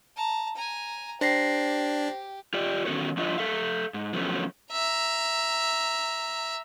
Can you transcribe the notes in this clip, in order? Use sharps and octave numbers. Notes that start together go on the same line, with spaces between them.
A5 A#5
G#5 A#5
D4 G4 C5 A#6 C7
F4 G4 D5
D#3 B3 C#4 F#4 A4 C#5
F3 D4 E4 F4 D#5
A4 E5 F5
G#2
D3 F3 F#3 A3 B3 C#4
E5 A#5